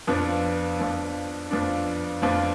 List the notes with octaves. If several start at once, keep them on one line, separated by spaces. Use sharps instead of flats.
F2 F3 B3 D4
F2 F3 B3 D4
F2 F3 B3 D4
F2 F3 B3 D4